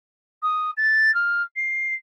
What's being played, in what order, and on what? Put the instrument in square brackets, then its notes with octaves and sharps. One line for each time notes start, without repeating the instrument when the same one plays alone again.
[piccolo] D#6
A6
F6
C7